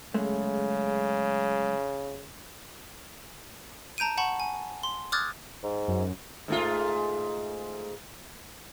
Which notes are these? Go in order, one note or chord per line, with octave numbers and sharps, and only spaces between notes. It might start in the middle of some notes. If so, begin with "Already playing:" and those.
F#2 C#3 G#3 A3
A5 A#5 G6 D7 D#7
F#5 A5 B5 C#6
G#5
C6
D6 D#6 F6 F#6 G#6 A6
G#2
F#2
G#2 A3 F4